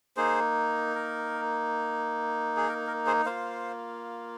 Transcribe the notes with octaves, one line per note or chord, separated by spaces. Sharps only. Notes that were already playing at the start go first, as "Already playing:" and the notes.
A#3 D#4 G#4 C5
A#4
G#4
A#4
A#4
G#4 C5
A#3 F4 C5 F5